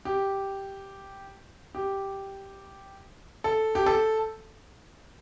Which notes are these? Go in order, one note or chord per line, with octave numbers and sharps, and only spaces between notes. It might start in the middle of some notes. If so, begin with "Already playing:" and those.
G4
G4
A4
G4
A4